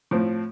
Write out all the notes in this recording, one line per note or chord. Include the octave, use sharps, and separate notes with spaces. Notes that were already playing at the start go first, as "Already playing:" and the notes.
A2 F3 C4